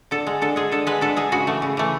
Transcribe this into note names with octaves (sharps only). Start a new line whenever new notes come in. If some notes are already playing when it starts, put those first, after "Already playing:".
D3 A4
G#3
D3 A4
G#3 G#4
D3 A4
G#3 B4
D3 A4
G#3 G#4
C#3 F#4
E3 A3
C#3
E3 A3